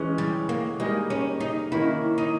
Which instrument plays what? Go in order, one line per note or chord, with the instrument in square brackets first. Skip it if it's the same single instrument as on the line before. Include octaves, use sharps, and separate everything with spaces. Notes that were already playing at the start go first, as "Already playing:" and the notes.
Already playing: [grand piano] E3 G#3 C#4
[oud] G3
A#3
[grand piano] G3 A#3 D#4 G#4 D#5 [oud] G#3
[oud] C#4
D#4
[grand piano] D#3 A#3 C#4 [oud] E4
[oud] D#4